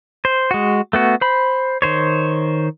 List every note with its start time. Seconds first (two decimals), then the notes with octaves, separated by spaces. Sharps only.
0.25 C5
0.51 G#3 F#4
0.93 A3 B3 F#4
1.21 C5 B5
1.82 D#3 C5 C#5